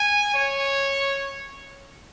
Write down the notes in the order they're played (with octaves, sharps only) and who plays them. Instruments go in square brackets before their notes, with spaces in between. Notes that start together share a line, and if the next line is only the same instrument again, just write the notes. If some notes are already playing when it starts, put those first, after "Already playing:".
Already playing: [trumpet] G#5
C#5